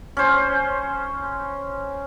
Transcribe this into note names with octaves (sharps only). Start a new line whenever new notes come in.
C#4 C5